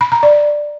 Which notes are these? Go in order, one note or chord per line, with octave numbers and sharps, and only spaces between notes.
B5
A#5
D5